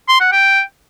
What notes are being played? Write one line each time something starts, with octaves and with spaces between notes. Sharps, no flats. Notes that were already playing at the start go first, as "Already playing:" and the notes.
C6
F#5
G5